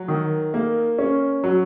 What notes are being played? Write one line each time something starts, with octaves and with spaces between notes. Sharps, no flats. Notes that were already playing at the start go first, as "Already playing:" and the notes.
Already playing: F#3
D#3
A#3
C#4
F#3